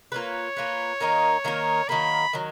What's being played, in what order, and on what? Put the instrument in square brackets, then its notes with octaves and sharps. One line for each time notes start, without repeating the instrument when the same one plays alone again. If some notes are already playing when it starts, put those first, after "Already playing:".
[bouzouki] A#3 F4 B4 [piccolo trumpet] C#5
[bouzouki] A#3 F4 B4
D#3 A#3 D#4 A#4
D#3 A#3 D#4 A#4
[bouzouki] D#3 F#3 A#3 [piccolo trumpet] B5
[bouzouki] D#3 F#3